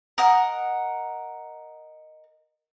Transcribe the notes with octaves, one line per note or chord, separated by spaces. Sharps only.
A#4 D#5 F#5